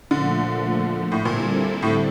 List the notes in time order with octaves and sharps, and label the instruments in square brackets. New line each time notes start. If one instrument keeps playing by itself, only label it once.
[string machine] A#2 F3 A3 [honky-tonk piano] D3
[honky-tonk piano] A2
[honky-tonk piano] A#2 [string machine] D3 G3 C4 E4 A4
[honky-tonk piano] A2